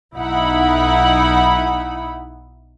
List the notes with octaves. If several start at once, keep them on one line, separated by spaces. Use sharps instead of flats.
B1 D#4 E4 F#5 B5